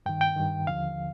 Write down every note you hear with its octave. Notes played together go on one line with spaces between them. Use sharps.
G2 D#3 G5
G5
G2 D#3
D#2 D3 F3 F5